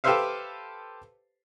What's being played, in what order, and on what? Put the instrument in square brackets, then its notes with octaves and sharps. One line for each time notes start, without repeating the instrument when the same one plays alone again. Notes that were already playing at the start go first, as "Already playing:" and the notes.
[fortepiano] G4 A4 B4 C5 E5 F5